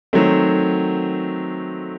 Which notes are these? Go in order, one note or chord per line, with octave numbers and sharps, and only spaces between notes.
D#3 F#3 A3 C4